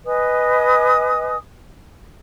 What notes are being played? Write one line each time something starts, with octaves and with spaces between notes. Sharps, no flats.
B4 D#5 G#5 D#6